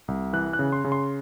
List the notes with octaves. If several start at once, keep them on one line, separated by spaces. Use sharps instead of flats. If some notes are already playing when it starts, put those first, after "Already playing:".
C2
E3 F#6
F#6
C#3
C6
C#3
C6